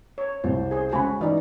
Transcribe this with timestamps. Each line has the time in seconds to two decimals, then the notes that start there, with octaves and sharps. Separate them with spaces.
0.18 C#5
0.44 C2 C5
0.71 G#4 C5
0.92 C#3 G#3 F#4 G#5 B5
1.21 E3 D#4 D5